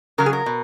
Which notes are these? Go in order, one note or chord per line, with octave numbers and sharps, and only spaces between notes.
C#3 F#3 A#4
G#4
A#4
B2